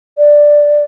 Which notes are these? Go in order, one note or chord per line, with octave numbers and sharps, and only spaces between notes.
D5